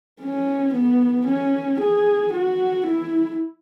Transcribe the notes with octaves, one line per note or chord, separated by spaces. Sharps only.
C#4
B3
C#4
G#4
F#4
E4